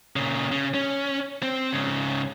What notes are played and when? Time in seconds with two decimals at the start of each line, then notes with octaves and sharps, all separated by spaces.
0.16 A#2 C#3
0.52 C#3
0.74 C#4
1.43 C4
1.73 G#2 C#3